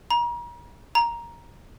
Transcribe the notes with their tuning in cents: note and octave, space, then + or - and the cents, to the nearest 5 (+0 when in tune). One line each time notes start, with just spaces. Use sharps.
A#5 +40
A#5 +10